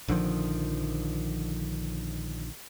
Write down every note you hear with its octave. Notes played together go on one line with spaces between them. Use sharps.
A#1 D3 D#3 F3